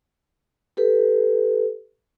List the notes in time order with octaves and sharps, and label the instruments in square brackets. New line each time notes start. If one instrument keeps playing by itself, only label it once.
[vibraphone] G4 A4 B4